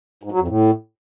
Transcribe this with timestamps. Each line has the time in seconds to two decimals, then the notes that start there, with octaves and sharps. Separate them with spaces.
0.23 G#2
0.32 F#3
0.40 F2
0.48 A2